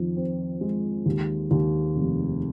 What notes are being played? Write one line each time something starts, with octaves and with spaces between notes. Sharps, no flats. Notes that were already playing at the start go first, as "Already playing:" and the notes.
Already playing: F2 D#3
C4
G#3
D#2
D#2
F1